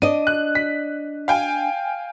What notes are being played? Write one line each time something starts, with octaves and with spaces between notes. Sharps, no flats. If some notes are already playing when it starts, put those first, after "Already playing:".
D4 D#5 D#7
F#6
B6
F5 G5 G#5